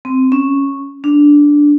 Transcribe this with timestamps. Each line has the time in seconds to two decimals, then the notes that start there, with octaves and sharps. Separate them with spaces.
0.05 C4
0.32 C#4
1.04 D4